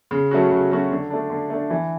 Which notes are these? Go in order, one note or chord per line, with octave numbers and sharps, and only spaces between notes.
C#3
F#3 A3 C#4 F#4
C#3
F#3 A3 C#4 F#4
D3
A3 D4
D3
A3 D4
E3